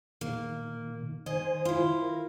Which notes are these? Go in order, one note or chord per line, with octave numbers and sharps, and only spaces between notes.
A#2 D#3 A#3
D#3 C5 D#5 G#5
E4 F4
A#4